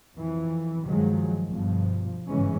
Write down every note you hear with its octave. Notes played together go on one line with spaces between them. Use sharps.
F2 E3
G2 D#3 F3 F#3 G#3
G1 G2 B2 F3
G1 G#2 C#3 E3 G#3 C#4